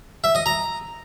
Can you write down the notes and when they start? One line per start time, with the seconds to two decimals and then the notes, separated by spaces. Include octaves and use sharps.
0.24 E5
0.35 D#5
0.46 A#5